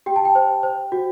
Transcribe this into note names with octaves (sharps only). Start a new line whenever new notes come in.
G4 G5
A5
G5
C5
C5
F#4